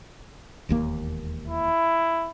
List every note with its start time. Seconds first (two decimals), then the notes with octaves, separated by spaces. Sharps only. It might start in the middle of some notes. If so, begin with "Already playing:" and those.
0.69 E1 D#2 A#3
1.48 E4